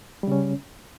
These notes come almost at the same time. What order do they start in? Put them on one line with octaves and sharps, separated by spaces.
G3 C#3 C#4